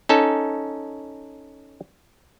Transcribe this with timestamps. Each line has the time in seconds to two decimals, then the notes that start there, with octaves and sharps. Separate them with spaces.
0.09 C#4 D#4 A4